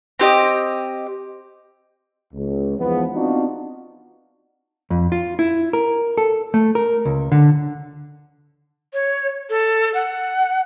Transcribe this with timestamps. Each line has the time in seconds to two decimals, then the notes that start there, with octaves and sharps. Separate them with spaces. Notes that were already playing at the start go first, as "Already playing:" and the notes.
0.19 C4 G4 D#5
2.34 C#2
2.78 E2 G#2 F3 B3
3.14 B3 C4 D4 D#4 F4 F#4
4.90 F2
5.12 F4
5.39 E4
5.73 A#4
6.17 A4
6.54 A3
6.75 A#4
7.05 C#2
7.32 D3
8.93 C#5
9.50 A4
9.94 F#5